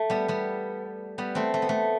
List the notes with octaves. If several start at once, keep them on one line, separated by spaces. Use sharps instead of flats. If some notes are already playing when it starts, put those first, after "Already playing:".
Already playing: A3
G3 B3
G3 B3
G3 B3
A3 C4
A3
B3
A3